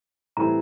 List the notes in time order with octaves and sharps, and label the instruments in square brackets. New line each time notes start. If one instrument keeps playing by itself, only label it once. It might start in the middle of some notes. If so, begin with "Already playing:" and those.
[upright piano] A2 E3 G3 C4 E4 [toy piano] A#5